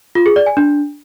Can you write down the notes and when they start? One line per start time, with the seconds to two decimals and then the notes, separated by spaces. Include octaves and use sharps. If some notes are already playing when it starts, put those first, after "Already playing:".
0.15 F4
0.26 G#4
0.36 D5
0.46 G#5
0.57 D4